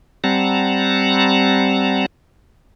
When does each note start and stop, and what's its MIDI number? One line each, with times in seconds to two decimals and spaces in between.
0.24 2.06 55
0.24 2.06 60
0.24 2.06 78
0.24 2.06 81
0.24 2.06 82